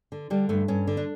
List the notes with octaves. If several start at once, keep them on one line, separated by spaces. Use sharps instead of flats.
D3
D3 G3
G2 A3
G2 C#4
D3
D4